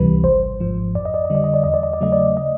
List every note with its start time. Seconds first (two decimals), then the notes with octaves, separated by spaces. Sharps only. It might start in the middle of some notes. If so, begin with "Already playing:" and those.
Already playing: C#2 C3 E3 G3 B4
0.24 G#1 C5
0.60 G#2 F3
0.95 F2 D5
1.05 D#5
1.14 D5
1.25 D#5
1.30 D3 G3 D5
1.44 D#5
1.54 D5
1.64 E2 D#5
1.74 D5
1.83 D#5
1.93 D5
2.01 C#3 F#3 A3 D#5
2.12 D5
2.37 D#5